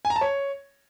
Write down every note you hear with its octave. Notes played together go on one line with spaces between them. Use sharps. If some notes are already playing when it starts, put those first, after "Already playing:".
G#5
A#5
A5
C#5